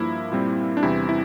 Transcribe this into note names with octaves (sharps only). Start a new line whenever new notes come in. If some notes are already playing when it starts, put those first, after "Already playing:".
Already playing: G2 F3 A#3 E4
A#2 G3 C4
D4
E2 C3 E3 G3 C4 E4
E4